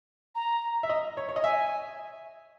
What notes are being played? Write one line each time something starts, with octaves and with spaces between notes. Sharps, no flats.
A#5
E5
D#5
C#5
C#5
D#5
E5 G#5